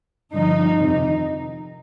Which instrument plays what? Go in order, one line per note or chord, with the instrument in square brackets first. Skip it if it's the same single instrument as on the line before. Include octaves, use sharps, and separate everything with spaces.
[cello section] G2 D3 F3 D#4
F2 C3 D#3 D#4